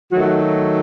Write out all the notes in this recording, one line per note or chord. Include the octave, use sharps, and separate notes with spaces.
D#3 F#3 A3 F#4